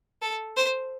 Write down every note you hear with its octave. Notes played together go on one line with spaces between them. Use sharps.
A4
C5